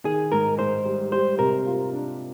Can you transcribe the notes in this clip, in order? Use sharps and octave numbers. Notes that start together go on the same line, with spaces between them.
D#3 G#4
G#2 A#4
G#2 C5
G3
G3 C5
C3 A#4
F4
D4